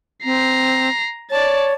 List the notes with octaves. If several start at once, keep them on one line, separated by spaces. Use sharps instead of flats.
C4 A#5 C7
C#5 D5 A5